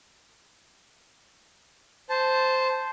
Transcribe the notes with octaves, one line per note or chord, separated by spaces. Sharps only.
C5 A5